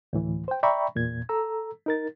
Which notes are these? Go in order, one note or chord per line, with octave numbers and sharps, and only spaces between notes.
D2 A2 E3
C5 G5
D5 E5 G5 A#5 B5 C#6
E2 A#2 G#6
A4 A#5 E6
D#4 A#4 A6